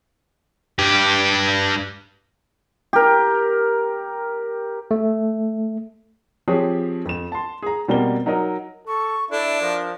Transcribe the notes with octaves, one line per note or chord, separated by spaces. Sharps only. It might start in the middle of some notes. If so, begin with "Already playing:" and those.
G2 G4
G4 A#4
A3
F3 C4 G4 G#4 C#5
F2 E7
A5 C6
G#4 A#5
B2 G3 A#3 C4 G7
F#3 D#4 A#4 D#5
A4 C#6
D4 E4 A4
F3 A#4